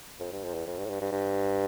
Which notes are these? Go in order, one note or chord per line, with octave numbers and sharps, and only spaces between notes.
F2
G2
F2
E2
F2
G2
A2
G2
G2
G2